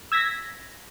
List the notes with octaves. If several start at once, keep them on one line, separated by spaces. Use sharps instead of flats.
E6 G#6 A#6 B6